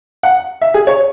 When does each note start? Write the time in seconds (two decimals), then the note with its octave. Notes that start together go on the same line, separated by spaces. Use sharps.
0.23 F#5
0.62 E5
0.74 G#4
0.87 C#5